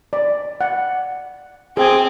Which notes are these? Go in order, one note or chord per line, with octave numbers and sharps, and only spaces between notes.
D5
F#5
C4 G#4 G#5